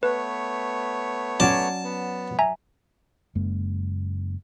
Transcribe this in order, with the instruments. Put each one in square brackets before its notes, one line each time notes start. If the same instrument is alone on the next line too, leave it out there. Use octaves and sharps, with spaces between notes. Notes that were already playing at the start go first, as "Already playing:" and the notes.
[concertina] A3 B3 C#5 [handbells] B4
[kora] F#3 C#4 D5 [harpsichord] A5
[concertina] B3
[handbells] E5 G#5 A#5
[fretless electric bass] F#1 F#2 G#3 A#3